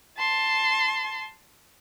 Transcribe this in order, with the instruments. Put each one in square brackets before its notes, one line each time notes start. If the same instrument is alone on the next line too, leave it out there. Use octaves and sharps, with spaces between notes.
[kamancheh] A5 C6